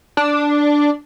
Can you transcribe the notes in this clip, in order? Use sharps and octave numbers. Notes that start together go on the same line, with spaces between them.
D4